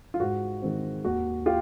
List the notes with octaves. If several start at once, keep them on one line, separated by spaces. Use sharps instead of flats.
F4
G#2 F#4
D#3 G#3 C4
D#2 F#4
F4 G4